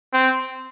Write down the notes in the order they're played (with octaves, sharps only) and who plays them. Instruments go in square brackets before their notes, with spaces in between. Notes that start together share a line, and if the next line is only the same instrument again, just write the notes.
[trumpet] C4